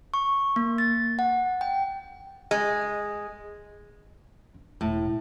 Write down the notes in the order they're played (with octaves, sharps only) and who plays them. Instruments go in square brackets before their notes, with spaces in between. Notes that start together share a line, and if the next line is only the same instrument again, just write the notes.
[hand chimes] C#6
A#3
A6
F#5
G5
[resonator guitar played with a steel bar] G#3
[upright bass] D4
[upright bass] E1 [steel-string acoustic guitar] A2